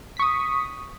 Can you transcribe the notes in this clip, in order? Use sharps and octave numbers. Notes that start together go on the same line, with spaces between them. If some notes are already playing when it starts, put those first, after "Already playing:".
C#6 D#6 B6